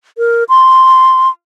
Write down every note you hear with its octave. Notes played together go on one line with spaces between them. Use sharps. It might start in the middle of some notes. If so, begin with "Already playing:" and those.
A#4
C6